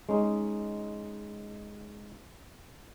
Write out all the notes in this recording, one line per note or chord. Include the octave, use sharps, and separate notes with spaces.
G#3 C#4 D#4